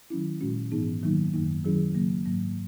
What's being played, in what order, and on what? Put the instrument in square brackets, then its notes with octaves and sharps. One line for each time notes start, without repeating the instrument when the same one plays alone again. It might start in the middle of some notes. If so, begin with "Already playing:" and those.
[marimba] D#3 F#3 C#4 E4
A#2 G#3 C#4 F#4
G#2 E3 B3 D#4 G#4
D#3 F#3 A#3 D#4
F#2 D#3 A#3 D#4
D#3 F#3 C#4 E4 G#4
C#3 F#3 A#3
G#2 F#3 A#3